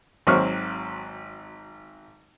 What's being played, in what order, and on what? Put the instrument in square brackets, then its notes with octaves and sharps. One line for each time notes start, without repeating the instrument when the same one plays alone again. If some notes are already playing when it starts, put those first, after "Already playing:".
[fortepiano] G#1 F#3 C4 C#6 F6